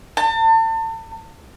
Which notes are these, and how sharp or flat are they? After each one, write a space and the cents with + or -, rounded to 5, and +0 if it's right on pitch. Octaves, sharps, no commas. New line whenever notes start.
A5 +35